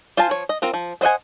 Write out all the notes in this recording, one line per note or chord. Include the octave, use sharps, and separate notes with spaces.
F4 C5 F5 G#5 A5
F3 C#5
D#5
C4 F4 A#4
F3
B3 C5 D#5 F#5 G#5